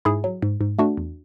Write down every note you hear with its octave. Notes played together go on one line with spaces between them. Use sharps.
G#2 E4 G#4
F#3
G#2
G#2
A3 D4 F#4
E2